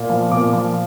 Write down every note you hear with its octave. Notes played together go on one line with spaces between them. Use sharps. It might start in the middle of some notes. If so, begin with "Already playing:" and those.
Already playing: A#2
F3
A#2 D6
F3